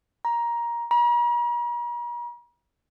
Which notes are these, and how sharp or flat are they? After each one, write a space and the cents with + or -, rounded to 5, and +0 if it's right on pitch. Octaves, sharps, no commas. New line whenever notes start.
A#5 +15
A#5 +45